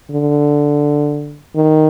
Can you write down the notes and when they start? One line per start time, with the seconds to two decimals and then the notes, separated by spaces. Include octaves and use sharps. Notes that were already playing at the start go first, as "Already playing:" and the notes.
0.11 D3
1.55 D#3